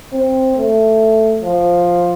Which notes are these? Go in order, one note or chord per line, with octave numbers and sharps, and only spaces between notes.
C4
A3
F3